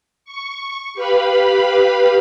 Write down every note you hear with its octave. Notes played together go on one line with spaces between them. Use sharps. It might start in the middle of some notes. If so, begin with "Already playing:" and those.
C#6
G4 B4 F5 B5